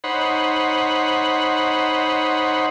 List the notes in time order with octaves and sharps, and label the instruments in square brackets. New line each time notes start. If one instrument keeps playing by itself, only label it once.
[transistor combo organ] D#4 C5 C#5 F#5 B5